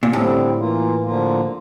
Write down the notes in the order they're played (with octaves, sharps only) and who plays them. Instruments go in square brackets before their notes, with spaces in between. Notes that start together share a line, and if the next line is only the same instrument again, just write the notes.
[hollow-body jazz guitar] A#2
[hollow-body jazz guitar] A2 [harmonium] D3 G3 C4
[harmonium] E3 A#3 F4
D3 F3 A#3 F4